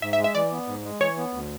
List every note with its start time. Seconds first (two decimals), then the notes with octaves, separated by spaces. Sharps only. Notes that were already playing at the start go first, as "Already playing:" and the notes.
0.02 G#2 E5
0.13 E5
0.18 G#3
0.24 E5
0.35 E3 D5
0.52 B3
0.67 G#2
0.84 G#3
1.01 E3 C#5
1.17 B3
1.33 D2